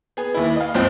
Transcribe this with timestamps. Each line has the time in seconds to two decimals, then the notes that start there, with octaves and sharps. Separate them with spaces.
0.17 B3 G#4
0.35 D#2 E4
0.56 D#5 F5
0.74 G1 C#2 F3 C4 C5 G5